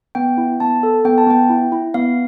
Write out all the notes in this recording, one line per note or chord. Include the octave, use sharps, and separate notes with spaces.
B3 G5
E4
B3 A5
A4
B3 G5
A5
B3 G5
E4
E4
B3 F5